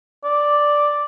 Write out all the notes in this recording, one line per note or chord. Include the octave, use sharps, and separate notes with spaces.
D5